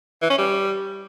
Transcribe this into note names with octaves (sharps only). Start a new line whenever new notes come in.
E3
C#4
G3